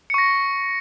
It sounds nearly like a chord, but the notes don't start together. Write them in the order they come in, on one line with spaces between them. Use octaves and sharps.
C#7 C#6 A#6